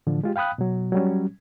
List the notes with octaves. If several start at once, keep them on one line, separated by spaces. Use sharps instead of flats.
A2 D3 E3 F3
G#3 F4 G4
F5 G5 B5 D#6 F#6
B2 F#3
F#3 G3 C#4